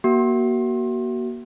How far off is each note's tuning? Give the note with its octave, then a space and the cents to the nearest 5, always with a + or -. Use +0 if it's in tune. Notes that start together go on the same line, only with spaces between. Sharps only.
A#3 +30 F#4 +30